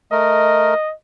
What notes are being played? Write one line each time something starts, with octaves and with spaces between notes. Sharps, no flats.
A3 A#4 D#5